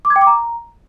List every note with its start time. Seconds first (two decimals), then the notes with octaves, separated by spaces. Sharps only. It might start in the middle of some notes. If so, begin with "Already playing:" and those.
0.05 D6
0.10 G#6
0.16 G5
0.21 D6
0.27 A#5